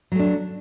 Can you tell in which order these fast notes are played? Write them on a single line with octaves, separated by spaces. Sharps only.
F#3 A3 D4